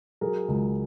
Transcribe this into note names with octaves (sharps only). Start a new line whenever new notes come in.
F#3 G#4 A#4
C#2